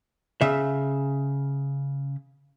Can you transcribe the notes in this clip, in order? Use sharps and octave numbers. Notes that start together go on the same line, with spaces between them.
C#3 E5